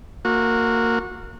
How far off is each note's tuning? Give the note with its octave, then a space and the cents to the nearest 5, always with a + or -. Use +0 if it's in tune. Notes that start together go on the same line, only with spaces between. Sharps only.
A#3 -15 F#4 -25